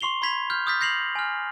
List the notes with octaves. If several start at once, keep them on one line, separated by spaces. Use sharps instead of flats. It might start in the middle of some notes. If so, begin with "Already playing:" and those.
C6 C#6 C7 F7 G7
B5 C6 G#6 B6 F7
F6 G6
D6 D#6 F6 G6 A6 B6
G6 A#6 C7 F7 F#7
G#5 F6